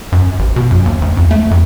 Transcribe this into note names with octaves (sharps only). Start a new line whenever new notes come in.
F#2
A1
B2
F#2
D#2
D2
F2
A3
F2